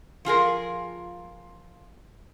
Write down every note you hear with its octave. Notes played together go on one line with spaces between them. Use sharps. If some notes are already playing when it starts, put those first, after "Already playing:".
F3 F4 G#4 A#4